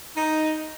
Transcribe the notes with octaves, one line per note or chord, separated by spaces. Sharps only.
D#4